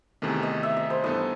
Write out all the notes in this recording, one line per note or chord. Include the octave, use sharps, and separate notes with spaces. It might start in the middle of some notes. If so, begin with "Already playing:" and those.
E2 C3 D#3 A3
D#5
E5
D#5
C5
G2 E3 B3 D#4 A4 D#5